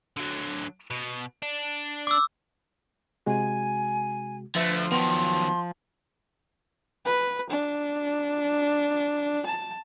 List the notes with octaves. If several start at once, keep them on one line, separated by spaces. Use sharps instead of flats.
D3 F#3
B2
D4
D6 E6
C3 G#3 F#4 G#5
D3 F3 A3 B4 E5 A6
D#3 F#3 B3 C6
B4
D4
A5